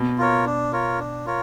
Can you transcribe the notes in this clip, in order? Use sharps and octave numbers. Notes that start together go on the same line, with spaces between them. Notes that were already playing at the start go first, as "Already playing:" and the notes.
Already playing: B2
F4 A#4 C#5
D4
F4 A#4 C#5
D4
F4 A#4 C#5